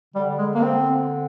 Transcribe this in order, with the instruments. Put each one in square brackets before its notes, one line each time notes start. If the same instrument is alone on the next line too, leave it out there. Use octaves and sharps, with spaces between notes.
[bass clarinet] D3 [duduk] G3
[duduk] G#3
A#3
C4